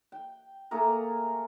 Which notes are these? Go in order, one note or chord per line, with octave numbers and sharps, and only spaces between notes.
G5
A3 A#3 G#4 A#4